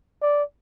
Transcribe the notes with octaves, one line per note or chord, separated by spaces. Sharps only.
D5